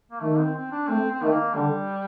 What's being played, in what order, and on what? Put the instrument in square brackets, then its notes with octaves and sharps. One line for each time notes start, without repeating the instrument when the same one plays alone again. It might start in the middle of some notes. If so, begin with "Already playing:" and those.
[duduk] A#3
[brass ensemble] D#3 [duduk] A3
[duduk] C4
C4
D4
[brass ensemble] A3 [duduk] C4
[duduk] C4
[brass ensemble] D#3 [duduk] A3
[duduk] A#3
[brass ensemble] D3 [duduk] G3